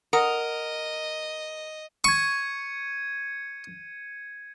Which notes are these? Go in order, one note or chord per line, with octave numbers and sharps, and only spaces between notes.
A#4 D#5 F#5 D#6
C#6 G#6 C#7 D#7